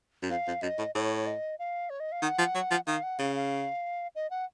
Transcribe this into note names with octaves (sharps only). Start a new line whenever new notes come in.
F#2
F2 F5
F2
F#2 D#5
A2
A2 C#5
D#5
F5
C#5
D#5
F5
D#3 F#5
F3
F#3
F3
D#3 F5
F#5
C#3 F5
F5
D#5
F#5